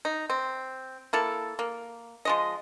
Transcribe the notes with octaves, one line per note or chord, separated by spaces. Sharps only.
D#4
C4
A#3 E4 A4
A#3
F3 G#3 D#5